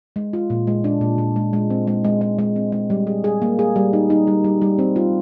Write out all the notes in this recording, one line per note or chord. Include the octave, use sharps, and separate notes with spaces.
G#3
F4
A#2
G#3
D4
A#2
A#2
G#3
G#3
C4
G#3
G#3
G#3
G#3
C4
G#3
G3
G#4
G#4
A#3
G#4
G3
D#4
D#4
G3
G3
G3
C4
F4